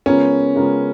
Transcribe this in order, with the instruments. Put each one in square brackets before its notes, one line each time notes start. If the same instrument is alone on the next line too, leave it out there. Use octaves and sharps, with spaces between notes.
[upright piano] C#3 G#3 B3 F4 A#4 [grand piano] C#4
[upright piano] C#3 G#3 B3 F4 A#4